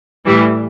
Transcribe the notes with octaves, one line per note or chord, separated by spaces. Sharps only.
A2 E3 G3